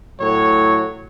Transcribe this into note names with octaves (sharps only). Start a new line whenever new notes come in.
A2 F#3 C#5